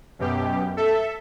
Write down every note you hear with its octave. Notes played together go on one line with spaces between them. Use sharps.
F#2 B2 G4
A4 E5